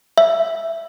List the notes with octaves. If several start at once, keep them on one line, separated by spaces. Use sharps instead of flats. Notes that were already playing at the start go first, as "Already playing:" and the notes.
E5